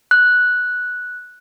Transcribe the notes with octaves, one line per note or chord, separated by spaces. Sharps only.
F#6